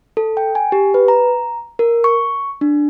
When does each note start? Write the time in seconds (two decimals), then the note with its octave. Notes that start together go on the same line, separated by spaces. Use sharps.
0.17 A4
0.37 G5
0.55 G#5
0.72 G4
0.94 B4
1.08 A#5
1.79 A#4
2.04 C#6
2.61 D4